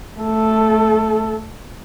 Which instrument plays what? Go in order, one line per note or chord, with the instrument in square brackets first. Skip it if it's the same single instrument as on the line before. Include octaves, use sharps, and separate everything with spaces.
[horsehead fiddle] A3 A4